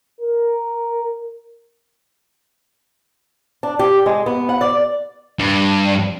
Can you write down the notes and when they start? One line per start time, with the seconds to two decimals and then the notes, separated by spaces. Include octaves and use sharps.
0.20 A#4
3.63 D4
3.79 G4
4.06 G#3
4.26 B3
4.49 F#5
4.61 D5
5.39 G2